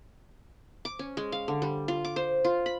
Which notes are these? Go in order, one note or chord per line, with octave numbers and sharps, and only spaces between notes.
D6
C#4
G#3
F5
D3
G3
F4
D6
C5
F4
B5